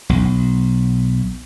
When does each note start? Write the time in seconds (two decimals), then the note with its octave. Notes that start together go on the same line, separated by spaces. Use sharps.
0.09 B1